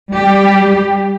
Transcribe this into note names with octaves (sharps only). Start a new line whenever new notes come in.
G3 G4